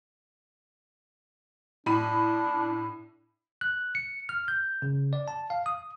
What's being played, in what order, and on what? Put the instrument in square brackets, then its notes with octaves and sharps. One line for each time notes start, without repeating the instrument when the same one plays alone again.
[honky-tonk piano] A2 B5 D#7 [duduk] D4
[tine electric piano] F#6
C#7
F6
G6
C#3
D5
A5
F5
D#6